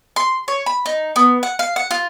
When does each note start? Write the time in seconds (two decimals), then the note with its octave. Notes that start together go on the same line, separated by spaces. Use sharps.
0.16 C6
0.48 C#5
0.66 B5
0.86 D#4
1.16 B3
1.43 F#5
1.59 F5
1.76 F#5
1.91 F4